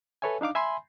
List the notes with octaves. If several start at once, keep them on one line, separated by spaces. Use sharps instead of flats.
A4 B4 C#5 E5 G#5
D4 D#4 F5 D6
E5 G#5 B5 C6